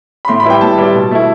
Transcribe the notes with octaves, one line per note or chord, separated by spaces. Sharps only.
B5
A2 C6
B5
G3 B3 E4 G5
A2 A5
G3 B3 E4
B2
A3 E4